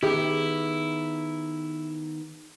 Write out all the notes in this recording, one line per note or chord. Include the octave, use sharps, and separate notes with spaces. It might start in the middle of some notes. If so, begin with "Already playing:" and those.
D#3 B3 E4 G4 G#4